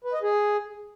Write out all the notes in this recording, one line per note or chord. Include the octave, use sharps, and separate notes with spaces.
B4
D#5
G#4